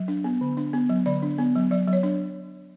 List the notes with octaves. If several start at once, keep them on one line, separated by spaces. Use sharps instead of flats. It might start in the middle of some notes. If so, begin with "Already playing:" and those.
Already playing: F#3
D4
B3
D3
D4
B3
F#3
D3 D5
D4
B3
F#3
F#3 D5
F#3
C#5
D4